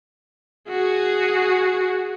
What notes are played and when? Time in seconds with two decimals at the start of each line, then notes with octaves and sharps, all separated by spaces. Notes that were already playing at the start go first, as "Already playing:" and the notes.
0.69 F#4 G#4